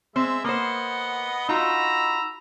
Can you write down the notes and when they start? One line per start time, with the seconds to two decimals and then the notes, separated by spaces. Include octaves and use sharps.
0.16 G#3 C4 E5
0.44 A#3 B3 C5 D#5 F#5
1.48 D#4 F4 F#4 A#5 B5 E6